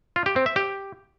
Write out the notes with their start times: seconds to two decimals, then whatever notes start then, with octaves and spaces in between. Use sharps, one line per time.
0.16 F4
0.26 G4
0.36 C4
0.46 E5
0.56 G4